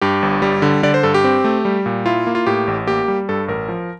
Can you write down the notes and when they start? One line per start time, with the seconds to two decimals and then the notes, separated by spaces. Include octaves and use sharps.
0.02 G2 G4
0.22 G1
0.42 G3
0.62 D3
0.83 D3 D5
0.94 C5
1.03 G2 A4
1.14 G4
1.24 C4
1.44 A3
1.65 G3
1.86 A#2
2.06 E4 F4
2.27 A#3
2.35 F4
2.46 A2 G4
2.67 A1
2.87 A#3 G4
3.08 G3
3.29 G2 A4
3.48 A1 A#4
3.69 F3